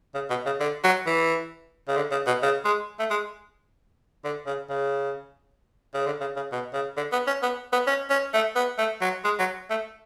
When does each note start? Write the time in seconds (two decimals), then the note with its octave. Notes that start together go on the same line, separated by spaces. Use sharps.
0.14 C#3
0.30 B2
0.45 C#3
0.60 D3
0.84 F#3
1.06 E3
1.88 C#3
1.96 D3
2.11 C#3
2.27 B2
2.42 C#3
2.65 G#3
2.99 A3
3.10 G#3
4.24 D3
4.46 C#3
4.69 C#3
5.94 C#3
6.06 D3
6.21 C#3
6.36 C#3
6.52 B2
6.73 C#3
6.97 D3
7.12 B3
7.27 C#4
7.42 B3
7.73 B3
7.87 C#4
8.10 C#4
8.33 A3
8.55 B3
8.78 A3
9.01 F#3
9.24 G#3
9.39 F#3
9.70 A3